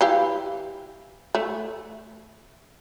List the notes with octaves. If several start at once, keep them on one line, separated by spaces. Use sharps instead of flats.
E3 G4 F5
A3